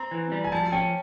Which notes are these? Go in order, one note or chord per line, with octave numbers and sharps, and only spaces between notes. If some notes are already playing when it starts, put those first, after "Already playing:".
Already playing: C4 A#5
E3
G3
G#5
F3 A5
C#4 G5